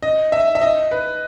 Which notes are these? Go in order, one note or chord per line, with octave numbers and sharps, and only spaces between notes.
D#5
E5
E5
D#5
B4